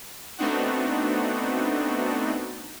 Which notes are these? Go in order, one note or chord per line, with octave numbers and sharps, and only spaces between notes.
A3 B3 C4 D4 D#4 F#4